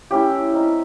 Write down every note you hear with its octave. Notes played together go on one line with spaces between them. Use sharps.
A3 C#4 E4 G4
G3 C4 D#4